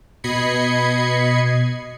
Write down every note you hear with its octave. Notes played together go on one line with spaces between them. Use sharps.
B2 D#5 B5 G#6 C7 C#7